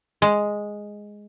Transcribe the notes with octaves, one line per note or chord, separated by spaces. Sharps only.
G#3